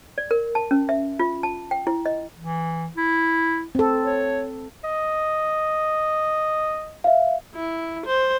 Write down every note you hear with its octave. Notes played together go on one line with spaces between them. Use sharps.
D5
A#4
A5
C#4
E5
F4
A5
G5
E4
D#5
E3
E4
C4 A4
C#5
D#5
E5 F5
E4
C5